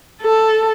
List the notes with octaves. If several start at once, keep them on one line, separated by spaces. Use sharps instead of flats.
A4